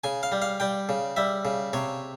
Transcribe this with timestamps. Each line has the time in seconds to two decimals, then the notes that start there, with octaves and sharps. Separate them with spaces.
0.04 C#3 G#5
0.23 F5
0.32 G3
0.42 F5
0.60 G3 G5
0.89 C#3
1.16 G3 E5
1.45 C#3
1.73 C3 C#5